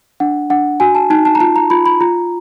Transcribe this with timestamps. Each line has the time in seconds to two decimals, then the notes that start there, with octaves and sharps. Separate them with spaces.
0.20 D4 F#5
0.50 D4 F#5
0.80 F#4 G#5
0.95 A5
1.10 D#4 A5
1.25 A5
1.35 A#5
1.40 F4 A5
1.56 A#5
1.70 F4 B5
1.86 B5
2.01 F4 A#5